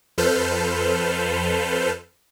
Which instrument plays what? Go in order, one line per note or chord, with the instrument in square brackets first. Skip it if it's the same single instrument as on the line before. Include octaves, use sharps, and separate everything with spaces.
[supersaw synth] F2 A4 B4 C5 F6 G6